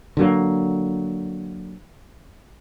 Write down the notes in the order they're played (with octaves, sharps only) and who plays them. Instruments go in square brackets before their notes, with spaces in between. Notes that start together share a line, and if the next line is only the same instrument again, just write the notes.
[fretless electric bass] D3 F#3 A#3